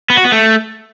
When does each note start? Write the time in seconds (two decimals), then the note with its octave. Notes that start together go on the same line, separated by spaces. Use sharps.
0.10 B3
0.17 F#4
0.25 B3
0.32 A3